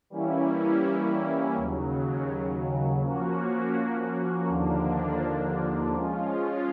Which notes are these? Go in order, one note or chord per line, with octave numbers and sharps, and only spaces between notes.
E3 G3 A#3 C#4 E4
D#2 C#3 F#3
F3 A#3 C#4 F#4
D#2 D3 F3 A#3 D4
F3 G#3 C#4 F4